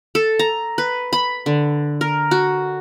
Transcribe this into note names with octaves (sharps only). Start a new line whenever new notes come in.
A4
A#5
B4
B5
D3
A#4
F#4